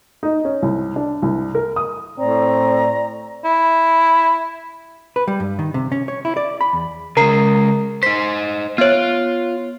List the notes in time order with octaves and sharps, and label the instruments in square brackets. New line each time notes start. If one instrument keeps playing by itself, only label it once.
[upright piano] D#4
C#4
C2
D4
C2
A#4
D#6
[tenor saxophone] A2 [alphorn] C4 [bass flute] D5 [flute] A#5
[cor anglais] E4
[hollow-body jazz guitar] B4
G3
G2
D#3
C3
C#4
C#5
E4
D5
B5
E2
[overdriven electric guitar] C#3 G#3 [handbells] A#4 A#5 C7
[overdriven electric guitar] D#4 C5 [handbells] B6
[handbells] B3 C#5 [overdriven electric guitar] F4